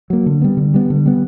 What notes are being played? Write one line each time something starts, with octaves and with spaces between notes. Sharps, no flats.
F#3 A#3
D3
G3 B3
D3
G3 B3
D3
G3 B3